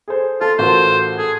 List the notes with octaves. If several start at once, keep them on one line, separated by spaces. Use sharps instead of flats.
G#4 A4 C5
F4 A4
A1 F4 F#4 A#4 C5
G#4 A4